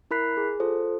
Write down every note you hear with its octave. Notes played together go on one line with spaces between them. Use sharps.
E4 A#4 B5 F#6 B6 C7
G#4
F4 A4 C5